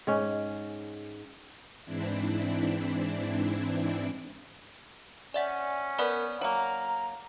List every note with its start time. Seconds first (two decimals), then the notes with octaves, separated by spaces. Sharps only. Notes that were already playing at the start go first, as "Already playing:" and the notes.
0.07 G#2 C#4
1.85 G#2 E3 C4 D4 E4
5.34 C#4 D5 E5 F#5
5.99 B3 A#4 D5
6.41 F#3 A#3 A#5